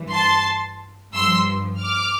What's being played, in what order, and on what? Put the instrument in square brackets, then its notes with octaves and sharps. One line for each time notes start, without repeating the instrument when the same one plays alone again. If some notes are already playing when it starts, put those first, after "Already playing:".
Already playing: [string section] G2 E3
A5 C6
G2 F3 C6 E6
D6 F6